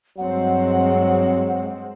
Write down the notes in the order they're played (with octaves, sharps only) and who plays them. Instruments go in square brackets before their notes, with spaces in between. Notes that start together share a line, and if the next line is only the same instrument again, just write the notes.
[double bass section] G2 G#3 C4 [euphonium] F#3 [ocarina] F#5